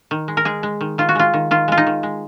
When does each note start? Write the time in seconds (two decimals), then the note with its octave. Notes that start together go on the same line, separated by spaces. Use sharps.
0.11 D#3
0.28 G#3
0.37 A#4
0.45 G#3 G#4
0.63 G#3
0.81 D#3
0.98 D#3 F4
1.09 F#4
1.15 G#3 F4
1.34 D#3
1.51 D#3 F4
1.68 G#3 F4
1.78 D#4
1.87 D#3
2.03 G#3